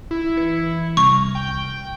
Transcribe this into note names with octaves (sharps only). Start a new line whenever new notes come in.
E4
E3 G#6 C#7
C2 C#6 F6 A#6
G5